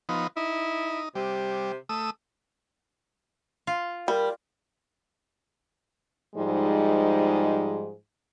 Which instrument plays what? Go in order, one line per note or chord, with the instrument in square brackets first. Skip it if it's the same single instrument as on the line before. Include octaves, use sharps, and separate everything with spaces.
[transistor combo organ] F3 B3 D#4
[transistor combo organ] D#4 [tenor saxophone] E4
[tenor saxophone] C3 [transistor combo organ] G3
[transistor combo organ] A3 D#6 E6
[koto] F4
[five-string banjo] G3 [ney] A#4
[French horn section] G#2 F3 G3 G#3 D#4